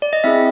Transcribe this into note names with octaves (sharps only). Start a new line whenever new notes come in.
D5
D#5
C4 E4 G#4 E5